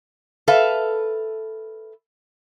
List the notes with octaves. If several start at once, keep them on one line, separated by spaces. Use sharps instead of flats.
A4 B4 E5 F5